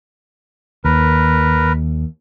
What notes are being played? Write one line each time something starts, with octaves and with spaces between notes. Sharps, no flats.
D#2 A#4 B4